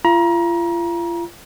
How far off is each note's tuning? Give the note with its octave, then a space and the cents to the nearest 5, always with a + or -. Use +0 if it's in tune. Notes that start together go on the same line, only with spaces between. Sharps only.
F4 -35 A#5 +30